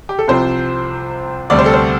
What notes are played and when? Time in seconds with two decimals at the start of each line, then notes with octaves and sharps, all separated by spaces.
0.09 G4
0.19 A4
0.28 C2 C3 F3 C4 C5
1.50 D2 C3 G3 D5
1.59 C5
1.66 A4
1.73 C5